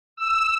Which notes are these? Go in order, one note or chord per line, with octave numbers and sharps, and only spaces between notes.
E6